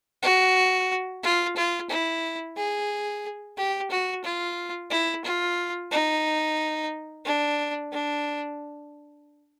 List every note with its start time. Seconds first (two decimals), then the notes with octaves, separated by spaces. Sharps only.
0.23 F#4
1.23 F4
1.57 F4
1.90 E4
2.56 G#4
3.57 G4
3.90 F#4
4.24 F4
4.91 E4
5.24 F4
5.92 D#4
7.25 D4
7.92 D4